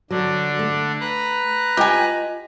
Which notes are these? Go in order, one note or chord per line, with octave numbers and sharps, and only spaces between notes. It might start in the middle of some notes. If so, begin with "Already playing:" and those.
D3 F#3 D4
A3
B4 A#5 F#6
F4 G4 D#5 G5 G#5